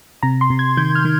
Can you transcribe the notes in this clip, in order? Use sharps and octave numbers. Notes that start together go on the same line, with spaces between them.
C3 A#5
C6
C3
G#6
D#3 G6
F6
D#3